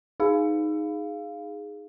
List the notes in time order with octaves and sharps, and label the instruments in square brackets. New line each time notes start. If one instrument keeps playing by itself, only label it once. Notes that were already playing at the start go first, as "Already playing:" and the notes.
[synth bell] D#4 G#4 F5